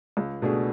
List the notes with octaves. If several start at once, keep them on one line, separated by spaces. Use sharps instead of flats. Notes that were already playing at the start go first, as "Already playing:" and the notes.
C#2
B2 A3 D4 G#4